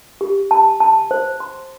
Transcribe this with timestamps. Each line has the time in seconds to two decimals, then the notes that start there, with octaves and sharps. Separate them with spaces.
0.21 G4
0.51 A5
0.80 A5
1.11 C5
1.40 C6